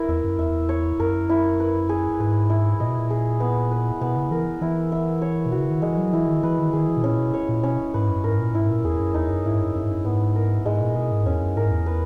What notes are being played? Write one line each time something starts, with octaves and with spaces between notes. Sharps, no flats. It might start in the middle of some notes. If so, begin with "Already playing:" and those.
Already playing: E4 A#4 B4
E2 E5
F#2
E2 E5
C#5
F#2 A#4
E4
B4
G#4
G#2 B4
E4
A#2 D#5
B2
A#2
G#4
B3
B4
B2 B3
C#3
E3 A#4
E3 E4
E5
C#5
B2
F#4
C#3
D#3
E3 G#3
F#3
E3 E4
D#3
E3 B4
D#3
D#3 G#4
E3
B2
A#2 C#4
B2
C#5
A#2
B2 C#4
G#2 B4
F#2
G#2 A#4
A#2
G#2 E4
A#2
E2 G#4
F#2
E2 D#4
F#2
G#2 E4
F#2
F#2 E5
G#2
F#2
G#2 B3
A#4
G#2 G#3
A#2
B2 G#4
G#2
E2 C#4
F#2
G#2 A#4
E2
B4